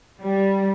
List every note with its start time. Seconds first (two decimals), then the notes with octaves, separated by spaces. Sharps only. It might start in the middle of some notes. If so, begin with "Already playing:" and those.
0.20 G3